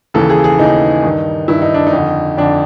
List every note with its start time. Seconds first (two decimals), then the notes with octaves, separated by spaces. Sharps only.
0.14 D#2 C#3 E3 A4
0.30 G#4
0.44 G#4
0.59 D#2 C#3 E3 D#4
1.03 G2 D#3
1.48 G2 D#3 E4
1.62 D#4
1.74 D4
1.87 D#4
1.93 F2 D3
2.38 F2 D3 D4